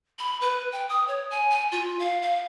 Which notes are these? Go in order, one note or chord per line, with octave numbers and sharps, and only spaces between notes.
B5
B4
G5
D#6
C#5
G#5
G#5
F4
F5
F5